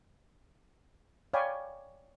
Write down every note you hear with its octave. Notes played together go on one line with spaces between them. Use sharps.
C#5 D5 F5 G5 G#5 B5